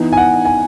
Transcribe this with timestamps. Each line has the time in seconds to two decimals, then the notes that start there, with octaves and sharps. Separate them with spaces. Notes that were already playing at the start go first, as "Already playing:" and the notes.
Already playing: E3 B3 D#4
0.13 G#5
0.17 F#5
0.45 G#5